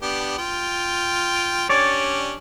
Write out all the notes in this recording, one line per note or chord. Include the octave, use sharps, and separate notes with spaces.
B3 D4 G4
F4 G5
C#4 D4 G4 C#5 D5